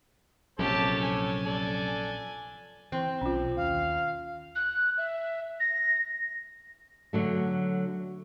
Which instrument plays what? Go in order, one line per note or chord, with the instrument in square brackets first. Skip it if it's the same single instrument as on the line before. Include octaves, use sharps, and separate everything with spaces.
[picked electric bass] A#1 [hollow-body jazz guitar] F#2 C3 [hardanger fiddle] G4 A5 [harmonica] A4 C#5
[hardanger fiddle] G#5
[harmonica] A4 D5
[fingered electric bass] E3 [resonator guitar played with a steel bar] C4
[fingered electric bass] B1 [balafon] C#4 F4
[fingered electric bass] D#2 [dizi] F5
[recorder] F#6
E5
A#6
[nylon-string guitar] D3 F#3 A3